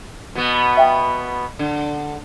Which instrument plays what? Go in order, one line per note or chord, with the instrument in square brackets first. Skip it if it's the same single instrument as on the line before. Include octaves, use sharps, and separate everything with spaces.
[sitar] B2 B3
[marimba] E5 G5
[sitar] D3